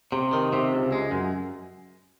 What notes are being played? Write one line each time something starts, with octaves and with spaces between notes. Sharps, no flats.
C3
D#3
C3
C#2
G#3
F#2